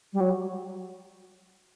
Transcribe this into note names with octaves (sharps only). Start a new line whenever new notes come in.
G3
F#3